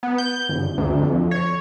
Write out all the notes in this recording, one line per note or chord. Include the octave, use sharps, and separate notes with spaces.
B3
G6
G1
D2
F2
C#5